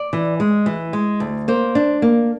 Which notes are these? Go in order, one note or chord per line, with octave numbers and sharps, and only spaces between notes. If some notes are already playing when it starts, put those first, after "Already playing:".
Already playing: D5
E3
G#3
E3
G#3
D2
A#3 C5
D4
A#3